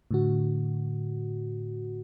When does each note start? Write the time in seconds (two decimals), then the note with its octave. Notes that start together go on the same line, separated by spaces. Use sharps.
0.11 A2 D3 F#4